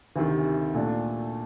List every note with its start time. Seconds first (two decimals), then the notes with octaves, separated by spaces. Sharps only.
0.16 D2 C3 D#3
0.74 A#2 A3 D4